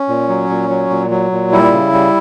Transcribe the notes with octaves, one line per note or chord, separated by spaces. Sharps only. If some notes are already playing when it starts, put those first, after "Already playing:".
Already playing: C#4
A#2
F#3
A#2
F#3
A#2
F#3
A#2
G3 E4
C#3
G3